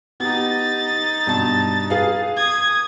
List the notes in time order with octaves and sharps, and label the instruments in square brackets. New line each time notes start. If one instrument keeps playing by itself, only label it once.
[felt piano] B3 G4 [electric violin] D#4 A6
[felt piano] G2 B2 A5
G#4 B4 F5
[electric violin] D#6 G#6